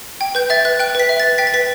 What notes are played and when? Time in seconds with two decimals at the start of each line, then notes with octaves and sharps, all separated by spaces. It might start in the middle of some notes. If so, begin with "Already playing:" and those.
0.21 G5
0.35 B4 G6
0.50 E5 A6
0.65 B4 F#6
0.80 G5 F#6
0.95 B4 B6
1.09 E5
1.20 A6
1.23 B4
1.38 G5 B6
1.47 A6
1.54 B4 B6